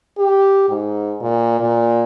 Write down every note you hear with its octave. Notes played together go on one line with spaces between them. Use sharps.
G4
G#2
A#2
A#2